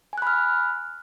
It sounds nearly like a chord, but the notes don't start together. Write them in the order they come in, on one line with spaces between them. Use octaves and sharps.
G#5 F#6 B5 F6